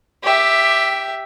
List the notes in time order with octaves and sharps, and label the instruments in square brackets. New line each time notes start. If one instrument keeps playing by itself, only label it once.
[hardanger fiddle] G4 E5